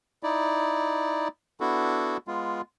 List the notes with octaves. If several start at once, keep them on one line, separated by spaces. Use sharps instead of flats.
D#4 E4 D5
B3 D4 E4 F#4 A4
G#3 B3 F4